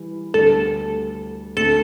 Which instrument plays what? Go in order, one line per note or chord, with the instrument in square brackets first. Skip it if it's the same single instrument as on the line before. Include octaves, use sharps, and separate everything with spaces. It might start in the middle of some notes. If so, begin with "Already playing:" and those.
Already playing: [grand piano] E3 G3
[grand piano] D2 D3 G3 B3 [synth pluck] A4
[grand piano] D2 D3 A3 [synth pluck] A4